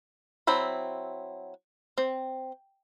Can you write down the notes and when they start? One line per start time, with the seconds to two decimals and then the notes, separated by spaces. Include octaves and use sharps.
0.47 F#3 C4 E4 B5
1.98 C4